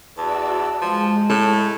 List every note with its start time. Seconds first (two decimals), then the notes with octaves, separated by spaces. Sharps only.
0.17 E2 F#4 D5 A5 E6
0.81 F3 G#3
1.30 A2 A4